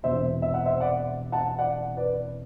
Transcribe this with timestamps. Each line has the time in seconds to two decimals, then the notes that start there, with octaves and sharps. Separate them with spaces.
0.03 E1 E2 C3 C5 E5
0.42 E5
0.54 F#5
0.65 C5 E5
0.80 D5 F#5
1.32 F#5 A5
1.59 D5 F#5
1.97 B4 D5